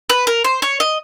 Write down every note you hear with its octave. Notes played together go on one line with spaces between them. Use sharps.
B4
A#4
C5
C#5
D#5